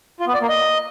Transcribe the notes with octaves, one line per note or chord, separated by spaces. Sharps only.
F4
B3
D5
A#3
D#5